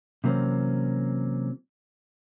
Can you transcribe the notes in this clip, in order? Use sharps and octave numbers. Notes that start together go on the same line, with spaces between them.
C3 E3 F#3 A#3 C4 C#4